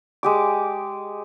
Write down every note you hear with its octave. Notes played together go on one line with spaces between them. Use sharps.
G#3 G4 D6